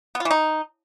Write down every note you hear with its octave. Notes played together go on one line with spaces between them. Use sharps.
B3
F4
E3
D#4